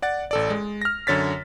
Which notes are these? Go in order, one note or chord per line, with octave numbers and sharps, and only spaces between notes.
D5 F#5 A6
A1 A4 D5
G#3
F6 A#6
F#2 D3 C#5 A6 B6